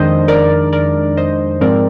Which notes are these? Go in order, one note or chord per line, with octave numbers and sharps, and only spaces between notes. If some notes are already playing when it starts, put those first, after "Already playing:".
Already playing: F2 D#3 G#3 D4 C5 D#5
A#4 D5
A#4 D5
C5 D#5
G#2 F3 G#3 C4 A#4 D5